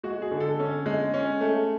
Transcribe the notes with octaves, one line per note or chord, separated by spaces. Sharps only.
G#3 F#4
G#4
D3
A4
C#4
G#3
C#4
A3